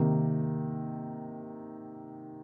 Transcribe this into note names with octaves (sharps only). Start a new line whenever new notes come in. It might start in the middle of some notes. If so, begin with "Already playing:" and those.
Already playing: C3 D#3 A#3